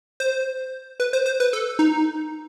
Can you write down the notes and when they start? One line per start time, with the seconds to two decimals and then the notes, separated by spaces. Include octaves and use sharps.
0.20 C5
1.00 B4
1.13 C5
1.26 C5
1.40 B4
1.53 A4
1.79 D#4